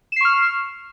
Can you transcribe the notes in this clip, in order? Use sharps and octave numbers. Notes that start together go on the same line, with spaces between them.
C#6 F6 C7 E7